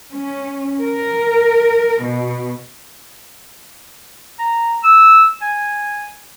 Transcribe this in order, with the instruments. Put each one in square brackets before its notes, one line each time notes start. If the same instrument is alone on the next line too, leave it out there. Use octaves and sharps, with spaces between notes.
[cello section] C#4
A#4
B2
[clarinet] A#5
E6
G#5